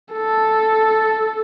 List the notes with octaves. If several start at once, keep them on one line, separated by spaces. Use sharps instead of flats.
A4